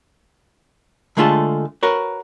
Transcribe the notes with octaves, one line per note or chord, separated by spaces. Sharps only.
D3 G#3 A3 F4 G#4 A4
F#4 A#4 B4 C#5